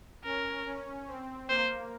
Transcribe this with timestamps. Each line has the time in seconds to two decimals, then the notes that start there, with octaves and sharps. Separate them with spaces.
0.24 C#4 A#4
0.66 C#4
1.08 C4
1.49 A#3 C5